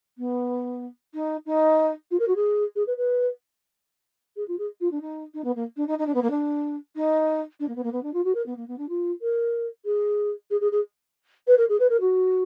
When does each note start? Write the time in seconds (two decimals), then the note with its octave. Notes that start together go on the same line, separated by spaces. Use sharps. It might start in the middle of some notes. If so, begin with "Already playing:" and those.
0.18 B3
1.14 D#4
1.46 D#4
2.11 F4
2.19 A#4
2.28 F#4
2.35 G#4
2.76 G#4
2.87 B4
2.97 B4
4.36 G#4
4.48 F4
4.58 G#4
4.80 F4
4.91 D4
5.01 D#4
5.34 D#4
5.44 B3
5.55 A#3
5.76 D4
5.87 D#4
5.98 D#4
6.06 D4
6.14 B3
6.22 A#3
6.30 D4
6.96 D#4
7.59 D4
7.68 A#3
7.75 B3
7.83 A#3
7.92 B3
8.03 D4
8.13 F4
8.24 F#4
8.35 A#4
8.46 B3
8.57 A#3
8.68 B3
8.78 D4
8.89 F4
9.22 A#4
9.85 G#4
10.50 G#4
10.61 G#4
10.72 G#4
11.47 B4
11.57 A#4
11.69 G#4
11.80 B4
11.90 A#4
12.01 F#4